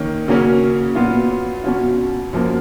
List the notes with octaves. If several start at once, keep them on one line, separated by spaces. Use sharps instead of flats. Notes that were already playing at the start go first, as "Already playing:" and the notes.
Already playing: D#3 A#3 C#4
C#3 F#3 A#3 C#4
A#2 F#3 B3 F4
B2 F#3 C#4 F4
F#2 F3 A#3